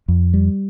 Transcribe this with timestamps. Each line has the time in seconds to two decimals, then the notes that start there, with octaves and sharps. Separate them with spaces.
0.08 F2
0.34 G3